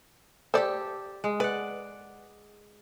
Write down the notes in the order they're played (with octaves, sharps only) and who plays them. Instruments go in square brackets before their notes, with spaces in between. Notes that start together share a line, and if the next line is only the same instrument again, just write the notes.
[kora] G4 A4 [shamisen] C5 D5
[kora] G#3
[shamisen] B4 [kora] D5 F#5